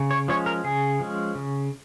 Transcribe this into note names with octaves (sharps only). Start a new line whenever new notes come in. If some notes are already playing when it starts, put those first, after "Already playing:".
Already playing: C#3
C#5
F3 G#3 C#4 C#5
A#4
C#3 G#4
F3 G#3 C#4
C#3